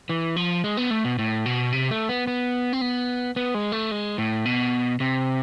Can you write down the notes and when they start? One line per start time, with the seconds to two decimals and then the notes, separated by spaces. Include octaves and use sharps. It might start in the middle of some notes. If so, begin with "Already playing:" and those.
0.09 E3
0.36 F3
0.64 G#3
0.77 B3
0.90 A3
1.04 B2
1.19 A2
1.46 B2
1.72 C3
1.91 A3
2.09 B3
2.27 B3
2.73 C4
2.81 B3
3.36 B3
3.54 G#3
3.72 A3
3.91 G#3
4.18 A2
4.45 B2
5.00 C3